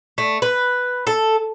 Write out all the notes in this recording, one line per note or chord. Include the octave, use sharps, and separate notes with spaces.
A3
B4
A4